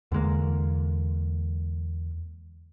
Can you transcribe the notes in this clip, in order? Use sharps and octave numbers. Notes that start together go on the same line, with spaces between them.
E2 D3 G#3 A#3